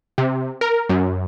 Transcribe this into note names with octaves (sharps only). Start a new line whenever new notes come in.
C3
A#4
F#2